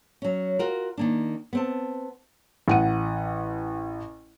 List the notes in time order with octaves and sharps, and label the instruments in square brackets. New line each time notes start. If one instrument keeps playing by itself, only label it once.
[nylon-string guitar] F#3 C#4
F4 F#4 A#4
D#3 A#3 D4
B3 C4 A5
[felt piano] A1 F#5 D#7